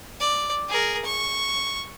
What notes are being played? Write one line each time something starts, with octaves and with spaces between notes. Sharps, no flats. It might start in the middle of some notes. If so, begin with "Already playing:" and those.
D5
G#4 A#4
C#6